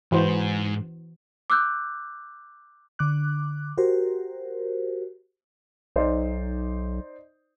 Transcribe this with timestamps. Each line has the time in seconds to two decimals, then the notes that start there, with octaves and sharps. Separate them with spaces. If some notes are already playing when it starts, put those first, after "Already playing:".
0.12 G#2 E3 F#4 C5
1.50 D6 E6 F#6 G6
2.99 D3 D6 F#6
3.78 F#4 G4 A#4 C5
5.96 B1 D#4 C5 D5